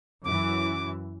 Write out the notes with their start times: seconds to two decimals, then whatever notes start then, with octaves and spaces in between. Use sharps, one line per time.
0.24 F#2 E3 D6